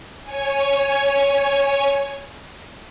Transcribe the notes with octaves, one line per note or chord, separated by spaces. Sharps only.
C#5 G#5